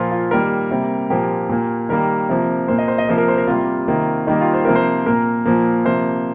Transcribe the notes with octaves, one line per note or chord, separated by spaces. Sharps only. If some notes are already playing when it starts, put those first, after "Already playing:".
Already playing: A#2 F3 A#3 F4
F4
D#3 G3 A#3 A#4
C3 G3 A#3
A#2 F3 A#3 G4
A#2 A#3
D#3 G3 A#3 A#4
C3 F3 A#3
A#2 A#3 C5
D#5
C5
D#5
C3 F3 A#3 C5
A#4
C5
A#4
C3 G3 A#3 F4
C3 D#3 A#3
D#3 G3 A#3 D#4
F4
C5
C3 F3 A#3 A#4
C5
A#2 A#3 A#4
A#2 F3 A#3
C3 F3 A#3 C5